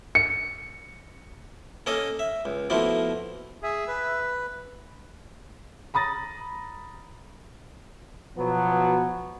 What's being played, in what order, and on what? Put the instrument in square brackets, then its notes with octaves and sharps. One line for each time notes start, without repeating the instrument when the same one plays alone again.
[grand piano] C#7
[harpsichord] A#3 C#4 A4 D#5
E5
C#2
B2 F3 A3 A#3 E4
[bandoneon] G#4 [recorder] E5
[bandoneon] B4
[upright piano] A#5 B5 D#6 A6 A#6
[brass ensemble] B2 F3 F#3 B3